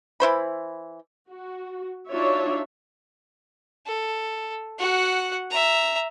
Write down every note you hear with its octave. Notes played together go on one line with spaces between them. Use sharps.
E3 E4 C5 B5
F#4
F#3 D4 D#4 F4 C#5 E5
A4
F#4 F#5
E5 A#5